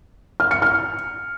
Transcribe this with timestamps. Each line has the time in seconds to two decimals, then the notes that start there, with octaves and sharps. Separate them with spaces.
0.40 F6
0.51 C#7
0.62 F6